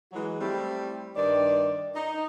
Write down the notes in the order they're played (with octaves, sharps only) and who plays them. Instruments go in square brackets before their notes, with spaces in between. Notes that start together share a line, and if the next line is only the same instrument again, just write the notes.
[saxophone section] E3 F#3 G#3 F#4
G3 A3 C4 E4
G2 D#3 D5
D#4